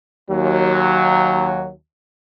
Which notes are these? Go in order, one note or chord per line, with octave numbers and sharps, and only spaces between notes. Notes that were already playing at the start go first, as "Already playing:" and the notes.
D#2 F#3